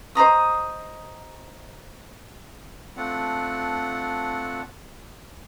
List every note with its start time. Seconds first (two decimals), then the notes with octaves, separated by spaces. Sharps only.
0.15 C5 D#5 A#5 D#6
2.97 A3 C4 D4 F4 F#5